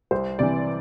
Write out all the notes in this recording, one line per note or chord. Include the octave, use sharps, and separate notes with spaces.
C2 C5
C3 E3 D5